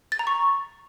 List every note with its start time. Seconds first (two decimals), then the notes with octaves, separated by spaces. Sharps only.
0.12 A6
0.19 A#5
0.27 C#6